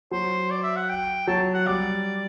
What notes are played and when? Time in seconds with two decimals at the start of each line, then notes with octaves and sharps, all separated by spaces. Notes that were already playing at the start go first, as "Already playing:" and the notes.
0.11 F#3 C5
0.50 D5
0.63 E5
0.76 F#5
0.89 G5
1.27 F#3 A5
1.54 F#5
1.67 G3 D5